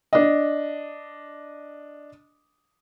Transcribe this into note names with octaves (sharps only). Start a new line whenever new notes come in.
D4 D#5